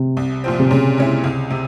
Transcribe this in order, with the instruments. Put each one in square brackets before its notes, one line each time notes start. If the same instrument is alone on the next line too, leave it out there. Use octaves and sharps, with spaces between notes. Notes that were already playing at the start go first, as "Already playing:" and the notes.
Already playing: [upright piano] C3
[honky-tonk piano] C2
A#2 F3 C4
[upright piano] C3
[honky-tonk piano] A#2 [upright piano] C#3
[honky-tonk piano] G#3 C#4 E4
C#2
C3